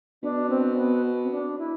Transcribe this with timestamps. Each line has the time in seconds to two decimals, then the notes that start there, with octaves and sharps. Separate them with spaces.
0.23 B2 D4
0.50 C4
0.77 B3
1.23 C4
1.31 D4
1.59 E4